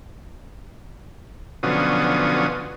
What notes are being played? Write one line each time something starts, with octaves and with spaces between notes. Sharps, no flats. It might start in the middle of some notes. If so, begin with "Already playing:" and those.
B2 D3 F3 F#3 C#4 D#6